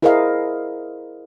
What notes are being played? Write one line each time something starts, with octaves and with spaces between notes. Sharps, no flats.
E4 G#4 A#4 C5 D#5 F5